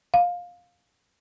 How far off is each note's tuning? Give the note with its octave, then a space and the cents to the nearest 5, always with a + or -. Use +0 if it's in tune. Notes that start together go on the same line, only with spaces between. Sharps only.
F5 +15